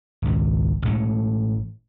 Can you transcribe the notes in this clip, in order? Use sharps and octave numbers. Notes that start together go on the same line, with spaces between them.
G#1 C#2
A1 A2 G#3 A3